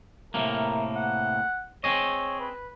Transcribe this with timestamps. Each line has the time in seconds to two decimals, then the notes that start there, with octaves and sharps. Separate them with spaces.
0.34 A2 C3 A#3 A#4
0.95 F#5
1.84 C4 G#4 C#5 D#5
2.40 B4